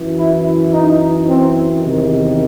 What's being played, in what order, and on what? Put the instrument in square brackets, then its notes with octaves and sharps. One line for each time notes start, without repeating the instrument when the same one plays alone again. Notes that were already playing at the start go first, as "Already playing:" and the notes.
Already playing: [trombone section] F#2 E3
E4
D#4
C4
E2 C3 D#3